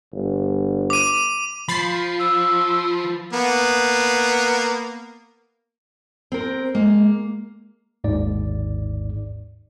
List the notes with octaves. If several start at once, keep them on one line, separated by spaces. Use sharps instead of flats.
G1
D6 D#7
F3 B5 A6 C7
E6
A#3 B3
C4 A#4
G#3 A#3
G#1 D#2 G#2 D5